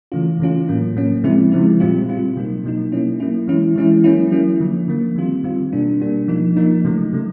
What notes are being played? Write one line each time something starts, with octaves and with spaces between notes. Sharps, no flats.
C#3 E3 A3 C#4 F4
C#3 E3 A3 C#4 F4
A2 F#3 A#3 C#4
A2 F#3 A#3 C#4
C#3 F3 G#3 C4 E4
C#3 F3 G#3 C4 E4
A#2 G3 C4 F4
A#2 G3 C4 F4
B2 F#3 A#3 D#4
B2 F#3 A#3 D#4
F#3 A#3 C#4 E4
F#3 A#3 C#4 E4
E3 G#3 C#4 E4
E3 G#3 C#4 E4
F#3 A#3 C#4 E4
F#3 A#3 C#4 E4
D3 F3 A#3
D3 F3 A#3
D#3 G3 C4 F4
D#3 G3 C4 F4
B2 G3 A#3 D4
B2 G3 A#3 D4
F3 A#3 D#4
F3 A#3 D#4
C#3 F#3 A3
C#3 F#3 A3